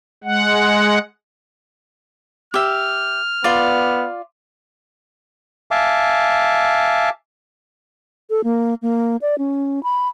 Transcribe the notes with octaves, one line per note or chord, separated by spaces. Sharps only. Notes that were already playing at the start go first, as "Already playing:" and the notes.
G#3 F#5
G4 E5 F6
B3 F4 D5
E5 F5 G#5 A5 D6
A4
A#3
A#3
D5
C#4
B5